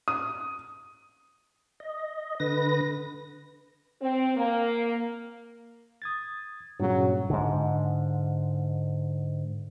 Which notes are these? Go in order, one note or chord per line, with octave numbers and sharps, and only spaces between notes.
D#6
D#5
D3 B4 A#6
C4
A#3
D#6 G#6 A6
G2 A#2 C#3 F#3
G#2 D3